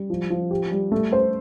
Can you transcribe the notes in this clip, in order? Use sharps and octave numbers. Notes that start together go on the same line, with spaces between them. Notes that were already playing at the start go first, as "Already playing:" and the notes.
Already playing: G3
F3
F3
G4
G3
A3
C5